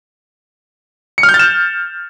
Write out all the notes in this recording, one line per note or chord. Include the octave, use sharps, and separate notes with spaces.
C#7
F6
G6
A6
E7